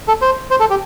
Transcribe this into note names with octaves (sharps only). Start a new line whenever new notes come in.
A4
C5
C5
A4
G4